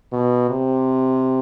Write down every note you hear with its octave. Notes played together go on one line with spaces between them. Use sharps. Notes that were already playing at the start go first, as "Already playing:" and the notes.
B2
C3